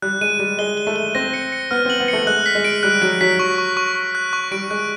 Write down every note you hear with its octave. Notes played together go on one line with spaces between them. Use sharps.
G3 F#6
G#3 D#7
G3 F#6
G#3 G7
G7
A3
G7
C4 A#6
C#7
C#7
B3 F6
C4
F#7
B3
A3 C#7
G#3 F#6
B6
G#3
D7
G3 F#6
F#3 D7
F#3 B6
C#6
C#6
C#6
C#6
F#6
C#6
G3 D7
G#3 F#6